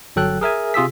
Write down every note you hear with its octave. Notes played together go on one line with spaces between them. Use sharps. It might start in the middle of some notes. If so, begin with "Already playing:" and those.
G1 F#3 A4 G5 F#6
G#4 A#4 E5 G#5
C3 F4 G#4 E6 B6